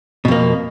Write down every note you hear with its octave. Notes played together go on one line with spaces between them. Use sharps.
F2 B2 A#3